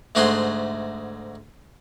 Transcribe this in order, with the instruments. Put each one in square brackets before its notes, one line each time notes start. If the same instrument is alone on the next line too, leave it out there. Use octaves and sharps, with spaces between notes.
[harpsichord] D2 G#2 A3 F#4 G#4 C6